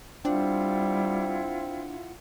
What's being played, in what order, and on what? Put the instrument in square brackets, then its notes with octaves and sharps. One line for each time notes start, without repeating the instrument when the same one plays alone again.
[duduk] G3 [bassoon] C4 [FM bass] D4 [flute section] E4 F4 F#5